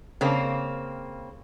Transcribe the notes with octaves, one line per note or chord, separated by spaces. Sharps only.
C#3 A#3 C4